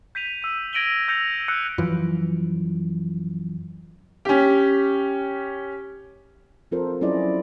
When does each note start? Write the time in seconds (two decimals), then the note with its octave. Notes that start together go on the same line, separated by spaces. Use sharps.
0.15 G6 B6 D#7 F7
0.42 E6 D#7
0.73 G#6 A#6 D7 D#7 F#7 G7
1.08 E6 G6 A#6 C#7 F7
1.48 E6 F#6 C#7
1.78 F#2 E3 F3
4.25 C#4 G4
6.71 F3 C4 F4 A4 A#4 C5
7.01 F#3 C#4 E4 G#4 D5 D#5